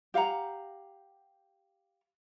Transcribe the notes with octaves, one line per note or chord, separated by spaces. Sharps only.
G4 F5 F#5 A#5